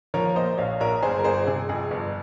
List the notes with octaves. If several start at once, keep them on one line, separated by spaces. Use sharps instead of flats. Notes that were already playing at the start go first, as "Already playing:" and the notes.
F3 A#4 C#5
A#2 C5 D#5
A#1 C#5 F5
A#1 A#4 C#5
G1 G#4 C5
A#4
G1 G#4 C5
C3 G#4
F2 G#4
G1